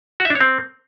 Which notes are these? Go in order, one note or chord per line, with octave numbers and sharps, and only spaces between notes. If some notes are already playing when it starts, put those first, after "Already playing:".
F#4
E5
D4
C#5
C4